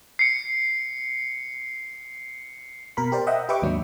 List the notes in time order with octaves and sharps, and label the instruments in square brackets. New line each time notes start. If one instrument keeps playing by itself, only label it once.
[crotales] C7 C#7
[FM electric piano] B2 A#4 B5
G4 A#4 C5 D5
D#5 E5 F#5 G5
G4 B4 E5 G5 C#6 D6
D#2 G#2 F#3 D4